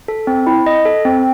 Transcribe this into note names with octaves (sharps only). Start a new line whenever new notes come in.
A4
C4
E4
D#5
A4
C4